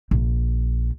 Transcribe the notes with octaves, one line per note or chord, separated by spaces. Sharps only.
A#1